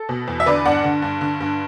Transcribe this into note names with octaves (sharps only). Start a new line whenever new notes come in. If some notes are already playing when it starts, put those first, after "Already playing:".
Already playing: A4
B2
E2
E5
D3 B4 D5
G2 D5 F#5
D3
G2
D3
G2